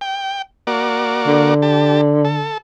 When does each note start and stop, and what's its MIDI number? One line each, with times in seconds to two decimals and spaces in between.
0.01 0.42 79
0.67 1.54 58
0.67 1.54 66
0.67 1.54 74
1.27 2.51 50
1.62 2.01 67
1.62 2.01 81
2.25 2.58 69